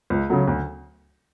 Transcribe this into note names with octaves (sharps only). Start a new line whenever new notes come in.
C#2
C#3 F#3 A3
D2